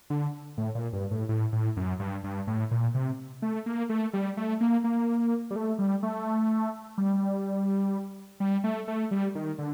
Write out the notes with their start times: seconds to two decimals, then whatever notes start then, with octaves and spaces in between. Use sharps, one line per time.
0.10 D3
0.58 A2
0.75 A#2
0.93 G2
1.11 A2
1.29 A2
1.52 A2
1.77 F#2
2.00 G2
2.24 G2
2.47 A2
2.71 A#2
2.94 C3
3.42 A3
3.66 A#3
3.89 A3
4.13 G3
4.37 A3
4.61 A#3
4.84 A#3
5.51 G3
5.56 A3
5.79 G3
6.03 A3
6.98 G3
8.40 G3
8.64 A3
8.88 A3
9.11 G3
9.35 D#3
9.58 D3